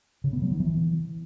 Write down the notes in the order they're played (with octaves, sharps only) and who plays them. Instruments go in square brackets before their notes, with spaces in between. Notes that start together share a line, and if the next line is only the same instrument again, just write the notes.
[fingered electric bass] C#3
B3
F#3
D#3
E3